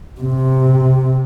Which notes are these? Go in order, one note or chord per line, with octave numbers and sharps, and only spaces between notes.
C3